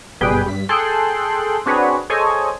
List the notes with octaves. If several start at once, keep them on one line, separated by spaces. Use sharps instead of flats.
G1 B2 G3 G#4 B4 G5
G2 B6
G#4 A4 G5 C6 F#6
C4 D4 F#4 G#4 B4 C#5
G#4 A4 C5 C#5 D#5 G#5